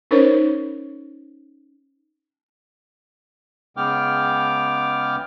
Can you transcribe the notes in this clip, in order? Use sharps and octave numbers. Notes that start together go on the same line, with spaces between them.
C#4 D#4 A#4 C5 C#5
C#3 G#3 B3 G5 D6 F6